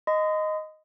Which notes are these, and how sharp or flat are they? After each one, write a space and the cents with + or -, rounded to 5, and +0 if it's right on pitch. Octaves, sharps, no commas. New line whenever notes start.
D#5 +0 C6 -45